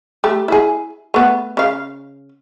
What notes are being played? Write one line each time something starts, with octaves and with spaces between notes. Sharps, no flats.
A3 G4
E4 G#4
A3 B3
C#3 F5